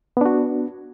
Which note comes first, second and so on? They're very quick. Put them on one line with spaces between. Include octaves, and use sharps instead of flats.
B3 D4 F#4